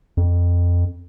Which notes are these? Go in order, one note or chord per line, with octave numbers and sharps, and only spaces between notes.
F2